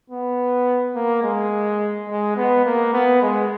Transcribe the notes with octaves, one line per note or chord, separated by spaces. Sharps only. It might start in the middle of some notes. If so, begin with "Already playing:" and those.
B3
A#3
G#3
G#3
B3
A#3
B3
G#3